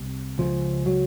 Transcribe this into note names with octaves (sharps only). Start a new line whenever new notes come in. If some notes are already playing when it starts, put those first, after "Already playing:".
Already playing: C2 C3
C#2 C#3 F3
F#3